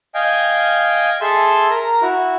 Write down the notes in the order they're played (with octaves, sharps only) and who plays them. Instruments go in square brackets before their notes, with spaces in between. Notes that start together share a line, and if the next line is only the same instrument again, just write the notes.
[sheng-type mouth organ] D#5 F5 G5 G#5
G#4 A4 E5 A5 C6
A#4 A#5
E4 F#4